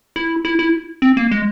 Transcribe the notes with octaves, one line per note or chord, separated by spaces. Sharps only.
E4
E4
E4
C4
A#3
G#3